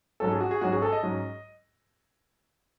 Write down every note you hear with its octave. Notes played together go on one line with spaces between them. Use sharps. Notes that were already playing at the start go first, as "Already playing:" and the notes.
G#2 F#3 C#4 A4
G#4
F#4
G#4
G#2 F#3 C#4 F#4
G#4
A4
D#5
G#2 F#3 C#4